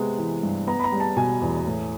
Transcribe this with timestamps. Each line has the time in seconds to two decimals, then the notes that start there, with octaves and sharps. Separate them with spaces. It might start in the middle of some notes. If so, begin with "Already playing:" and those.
Already playing: C3 G#3 B3
0.18 E3
0.43 G2
0.67 B3 A#5
0.80 B5
0.84 A#5
0.92 G3
1.00 A5
1.17 B2 G#5
1.42 E2
1.66 A2